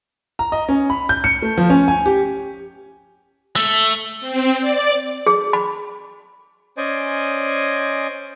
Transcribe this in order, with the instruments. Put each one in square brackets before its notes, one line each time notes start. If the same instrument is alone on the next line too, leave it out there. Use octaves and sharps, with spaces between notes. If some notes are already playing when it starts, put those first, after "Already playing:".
[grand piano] A#5
D#5
C#4
B5
G6
C#7
A3
F3
C#4
G#5
G4
[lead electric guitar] A3
[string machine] C4
D5
[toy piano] G#4
B5
[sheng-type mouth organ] C#4 C5 D5 D#5 G#5